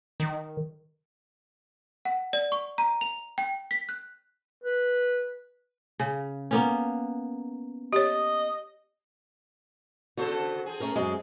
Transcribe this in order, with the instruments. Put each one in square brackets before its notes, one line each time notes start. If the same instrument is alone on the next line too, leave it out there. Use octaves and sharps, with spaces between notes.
[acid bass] D#3
[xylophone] F#5
D5
C#6
A#5
F7
G5
B6
F#6
[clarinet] B4
[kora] C#3 [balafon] G#5
[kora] A#3 B3 C#4
[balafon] G4 C#5 [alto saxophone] D#5
[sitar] C#3 A4 C5 [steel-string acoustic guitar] F#4
[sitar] C4 G#4
[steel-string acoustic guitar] A3 C#4 A#4
F#2 G#3